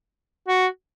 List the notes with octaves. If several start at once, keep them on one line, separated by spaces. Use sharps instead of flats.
F#4